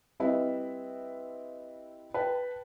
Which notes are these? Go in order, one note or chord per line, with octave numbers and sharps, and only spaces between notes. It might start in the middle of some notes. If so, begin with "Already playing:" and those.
G3 C4 E4 B4 D#5 E5
B4 G5 A5